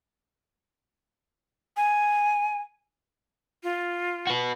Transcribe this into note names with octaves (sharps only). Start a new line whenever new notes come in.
G#5
F4
F#4 B4